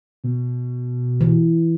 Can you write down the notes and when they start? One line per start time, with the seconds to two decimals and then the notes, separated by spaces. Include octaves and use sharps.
0.24 B2
1.21 E3